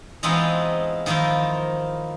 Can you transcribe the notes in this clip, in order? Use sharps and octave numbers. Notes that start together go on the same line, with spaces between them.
E3 G#3 B3 C4 D#4 F4
D#3 F3 A#3 E4 F4